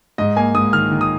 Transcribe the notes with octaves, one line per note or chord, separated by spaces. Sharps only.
G#2 D#5
A#3 G#5
G#2 D#6
D#3 F6
D#3
D#6